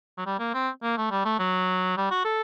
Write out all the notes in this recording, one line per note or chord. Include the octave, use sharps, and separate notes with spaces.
F#3
G3
A#3
C4
A#3
A3
G3
A3
F#3
G3
F#4
A4